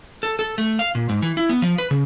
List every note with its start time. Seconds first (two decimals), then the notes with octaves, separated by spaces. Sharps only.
0.23 A4
0.39 A4
0.58 A3
0.79 F5
0.95 A#2
1.09 G#2
1.22 E3
1.37 E4
1.49 B3
1.62 F3
1.78 B4
1.91 C#3